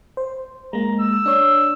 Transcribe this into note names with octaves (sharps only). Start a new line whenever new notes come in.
C5
G#3 A#3 A#5
E6
D4 C#5